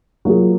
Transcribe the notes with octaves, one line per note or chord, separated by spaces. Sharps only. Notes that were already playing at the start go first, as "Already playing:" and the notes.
F#3 A#3 F4 G#4